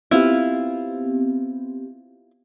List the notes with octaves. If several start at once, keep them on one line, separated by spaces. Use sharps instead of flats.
B3 C4 E4 F4 G4